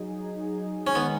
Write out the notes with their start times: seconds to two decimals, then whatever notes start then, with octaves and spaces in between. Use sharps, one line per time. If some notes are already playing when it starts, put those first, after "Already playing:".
Already playing: F#3 D#4 G#4
0.87 C#4
0.95 D#3 G#3 B3 D#4 G#4